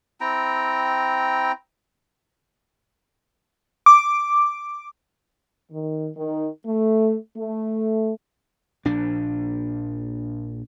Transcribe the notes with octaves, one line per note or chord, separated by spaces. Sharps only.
C4 E4 G5 A#5
D6
D#3
D#3
A3
A3
A#1 D4